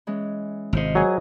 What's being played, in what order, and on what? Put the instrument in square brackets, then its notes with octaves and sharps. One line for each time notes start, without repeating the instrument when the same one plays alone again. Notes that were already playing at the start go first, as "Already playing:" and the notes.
[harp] E3 G#3 C#4
[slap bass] G#1 C3 [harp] F4 C5 D#5
[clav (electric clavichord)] F#3 G#5 [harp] G#4 A#4